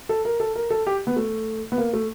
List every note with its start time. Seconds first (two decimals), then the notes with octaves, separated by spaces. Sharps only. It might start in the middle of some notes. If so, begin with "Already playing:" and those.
0.09 A4
0.25 A#4
0.40 A4
0.55 A#4
0.70 A4
0.87 G4
1.07 B3
1.16 A3
1.72 B3
1.78 A#3
1.93 A3